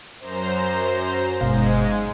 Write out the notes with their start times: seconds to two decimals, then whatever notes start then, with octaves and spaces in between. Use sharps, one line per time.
0.20 F#2 C5 A#5
1.41 G1 G#2 B2 G#3 F5